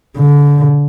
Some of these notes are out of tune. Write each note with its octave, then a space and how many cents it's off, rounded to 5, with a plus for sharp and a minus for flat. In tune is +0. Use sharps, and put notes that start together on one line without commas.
D3 -30